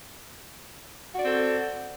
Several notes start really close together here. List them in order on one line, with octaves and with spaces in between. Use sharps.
F#4 D5 C4 A4